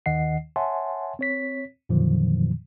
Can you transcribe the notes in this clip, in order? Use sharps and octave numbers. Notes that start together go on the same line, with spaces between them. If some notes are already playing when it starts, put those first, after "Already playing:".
D#2 D#3 D#5 F#5 C7
C#5 E5 F#5 G#5 A5 C6
C4 C#5 B6
F2 A#2 D3 D#3 F3 F#3